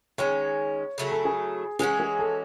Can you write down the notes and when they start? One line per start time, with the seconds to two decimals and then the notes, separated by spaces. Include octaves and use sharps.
0.18 D#3 G#3 C#4 C#5
0.98 C#3 F#3 A3 E4
1.12 A4
1.25 G#4
1.79 E3 G#3 C#4 F#4 G#4
2.00 G#4
2.19 A4